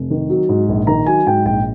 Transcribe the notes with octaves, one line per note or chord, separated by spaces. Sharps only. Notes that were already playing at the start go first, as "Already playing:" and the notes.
Already playing: F1
D#3
F#3
G#2
A#1
D#3 A#5
F#3 G#5
G#2 G5
A#1 G5